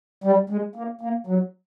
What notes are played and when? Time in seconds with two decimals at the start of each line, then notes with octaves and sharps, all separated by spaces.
0.24 G3
0.50 G#3
0.75 A#3
1.01 A#3
1.27 F#3